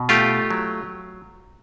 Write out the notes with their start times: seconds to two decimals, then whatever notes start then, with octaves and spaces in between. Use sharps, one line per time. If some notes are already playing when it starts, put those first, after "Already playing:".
Already playing: B2
0.09 A3 F4 G4
0.50 F#3